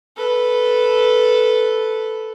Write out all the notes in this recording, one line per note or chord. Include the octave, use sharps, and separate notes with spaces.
A4 B4